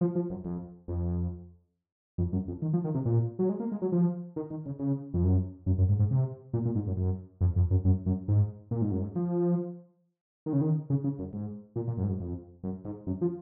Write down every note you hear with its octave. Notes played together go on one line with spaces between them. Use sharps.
F3
F3
F#2
F2
F2
F2
F#2
F2
D#3
F3
D#3
C3
A#2
F#3
G#3
A#3
G#3
F#3
F3
D#3
D#3
C#3
C#3
F2
F#2
F#2
F#2
G#2
G#2
C3
A#2
A#2
G#2
F#2
F#2
F2
F2
F#2
F#2
F#2
G#2
A#2
G#2
F#2
G#2
F3
D#3
C#3
D#3
C#3
C#3
F#2
G#2
A#2
A#2
F#2
G#2
F#2
F2
F#2
G#2
F#2
F3